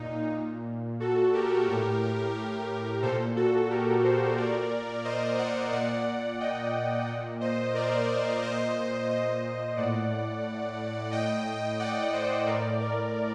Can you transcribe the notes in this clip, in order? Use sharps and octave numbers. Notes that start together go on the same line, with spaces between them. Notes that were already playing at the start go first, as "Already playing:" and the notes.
Already playing: A#2 D#4
A#2
F#4 A4
G4 A#4
A2
A#2 A4 C5
F#4 A4
G4 A#4
A4 C5
A#2 A#4 D5
C5 D#5
D5 F#5
A#2 D5 F#5
D#5 G5
A#2
C5 D#5
A#4 D5
A#2 C5 D#5
C5 D#5
A2 D5 F#5
A2 D#5 G5
D5 F#5
C5 D#5
A2 A#4 D5
A#4 D5